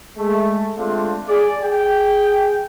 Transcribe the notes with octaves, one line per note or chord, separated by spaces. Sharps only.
G#3 A3
G#3 A3 C4 D4 F4
G#4 D5
G#4 G5